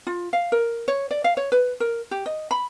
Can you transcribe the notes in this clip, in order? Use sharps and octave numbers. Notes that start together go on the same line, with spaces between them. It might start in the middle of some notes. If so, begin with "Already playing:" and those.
F4
F5
A#4
C#5
D5
F5
C#5
B4
A#4
G4
D#5
B5